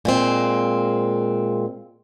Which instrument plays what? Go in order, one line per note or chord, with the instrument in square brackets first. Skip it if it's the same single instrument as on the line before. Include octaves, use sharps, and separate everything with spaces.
[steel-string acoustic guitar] A#2 G#3 C4